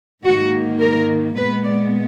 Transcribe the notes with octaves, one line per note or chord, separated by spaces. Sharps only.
G#2 D#3 A#3 F#4
A#4
A#2 G#3 B3 B4
D5